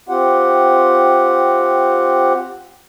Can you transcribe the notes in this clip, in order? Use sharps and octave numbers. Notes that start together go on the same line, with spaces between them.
C4 F4 G4 F#5